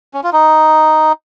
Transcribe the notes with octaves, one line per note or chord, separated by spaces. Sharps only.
C#4
F4
D#4